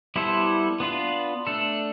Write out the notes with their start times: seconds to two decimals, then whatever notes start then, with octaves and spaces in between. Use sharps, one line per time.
0.16 G3 B3 E4 A4 C5
0.80 B3 D4 F4 B4
1.47 A3 D4 A4